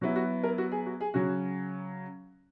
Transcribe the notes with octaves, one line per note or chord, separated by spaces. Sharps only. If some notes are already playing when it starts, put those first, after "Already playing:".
F#3 B3 E4 F#4
F#4
A#4
F#4
G#4
F#4
G#4
C#3 F#3 C#4 F#4